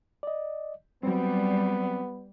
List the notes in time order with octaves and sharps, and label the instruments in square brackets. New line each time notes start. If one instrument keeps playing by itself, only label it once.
[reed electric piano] D5 D#5
[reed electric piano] F#3 C4 [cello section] G3 [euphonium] B3